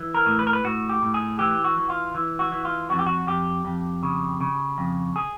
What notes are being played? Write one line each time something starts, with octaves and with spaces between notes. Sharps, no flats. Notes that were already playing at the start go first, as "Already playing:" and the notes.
Already playing: E3
A#4
A2
B4
A#4
B4
A2 F#4
G4
A2
G#4
E3 G4
F#4
E3
F4
E3
F#4
E3
F4
F2 F#4
G4
F#4
F2 G4
F2
C#3
C#3
F2
G#4